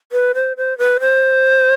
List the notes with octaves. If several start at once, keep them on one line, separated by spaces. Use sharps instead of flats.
B4
C5
C5
B4
C5